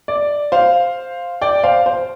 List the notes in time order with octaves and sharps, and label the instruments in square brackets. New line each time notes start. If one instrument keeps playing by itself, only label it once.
[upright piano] D5
C5 F5
D5 G5
C5 F5
C5